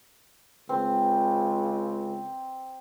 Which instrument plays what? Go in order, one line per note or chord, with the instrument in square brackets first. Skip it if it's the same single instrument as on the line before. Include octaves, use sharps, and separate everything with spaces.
[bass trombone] C#2 [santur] C4